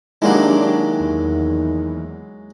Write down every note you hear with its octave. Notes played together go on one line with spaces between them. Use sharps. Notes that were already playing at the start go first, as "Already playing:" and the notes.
D#3 F#3 G#3 A#3 D4 E4 G4
E2